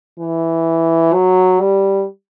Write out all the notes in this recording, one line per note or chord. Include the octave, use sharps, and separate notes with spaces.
E3
F#3
G3